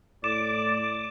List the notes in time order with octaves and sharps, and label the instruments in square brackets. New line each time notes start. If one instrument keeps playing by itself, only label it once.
[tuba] A2 [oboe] D5 [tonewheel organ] D6 [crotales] E7